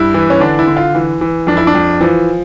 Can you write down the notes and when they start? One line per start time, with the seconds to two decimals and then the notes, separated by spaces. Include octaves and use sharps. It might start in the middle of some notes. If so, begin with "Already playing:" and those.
Already playing: G2 E4
0.14 E3
0.30 C#4
0.40 D3 D4
0.59 E4
0.67 D3
0.77 F4
0.95 E3
1.21 E3
1.47 F2 D4
1.57 E4
1.67 D4
1.75 F2
2.01 E3 F3